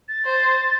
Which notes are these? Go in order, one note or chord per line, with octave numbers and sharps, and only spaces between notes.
A6
C5